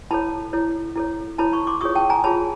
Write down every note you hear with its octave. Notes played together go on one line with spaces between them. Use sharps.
E4 A4 C#5 A5 B5
E4 A4 C#5
E4 A4 C#5
E4 A4 C#5 A5 B5
B5 C#6
C6 D6
F4 G#4 C#5 C#6 D#6
G5 A5
G#5 A#5
F4 G#4 C#5 A5 B5